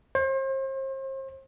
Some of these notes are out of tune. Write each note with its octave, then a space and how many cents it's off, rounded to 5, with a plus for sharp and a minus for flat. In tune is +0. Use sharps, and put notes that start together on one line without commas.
C5 +40